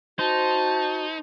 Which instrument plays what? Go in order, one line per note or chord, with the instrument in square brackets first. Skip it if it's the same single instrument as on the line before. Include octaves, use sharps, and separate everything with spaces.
[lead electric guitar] D#4 [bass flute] F#4 [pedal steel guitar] C5 [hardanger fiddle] A5